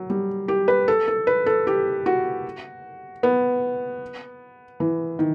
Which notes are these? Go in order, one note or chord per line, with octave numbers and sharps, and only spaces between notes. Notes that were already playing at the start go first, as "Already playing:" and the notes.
Already playing: F#3
G3
G4
B4
A4
A4
B4
A4
G4
F#4
B3
E3
D#3